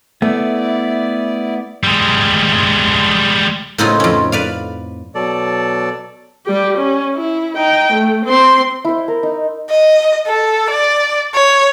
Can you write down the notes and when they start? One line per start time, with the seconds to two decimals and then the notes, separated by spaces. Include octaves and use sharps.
0.22 A3 B3 E4 D5
1.84 G3 G#3
3.78 A2 C#3 B3 C4 D#4 F4
4.00 F2 C#4
4.32 B4 D5 F5
5.15 B2 F#3 A4 D5
6.46 G3 G4
6.77 C#4
7.15 E4
7.56 D#4 G5
7.93 A3
8.26 C4 C6
8.85 E4 C5
9.08 A#4
9.23 D#4
9.70 D#5
10.27 A4
10.70 D5
11.35 C#5